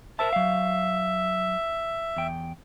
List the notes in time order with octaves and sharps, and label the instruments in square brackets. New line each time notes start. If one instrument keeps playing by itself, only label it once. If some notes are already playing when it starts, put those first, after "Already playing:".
[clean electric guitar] A#4 C5 A5 [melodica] E5
[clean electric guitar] F#3 F5
E2 G5